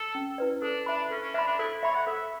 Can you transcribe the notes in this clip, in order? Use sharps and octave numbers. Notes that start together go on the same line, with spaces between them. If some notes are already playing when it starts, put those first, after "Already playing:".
Already playing: A4
C#4
E4 B4 D5
D4 A4
D4 E5 B5
C#4 A4
C#4
D4 E5 B5
D4
E4 A4
C#5 E5 B5
F#5
A4 E5